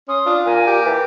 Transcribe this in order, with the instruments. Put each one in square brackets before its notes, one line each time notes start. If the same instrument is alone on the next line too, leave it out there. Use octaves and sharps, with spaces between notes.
[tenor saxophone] C#4 [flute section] C6 D#6
[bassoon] D4 [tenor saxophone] F4
[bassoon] A#2 [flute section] A#4 G#5
[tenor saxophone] G4
[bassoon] E3 [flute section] A#4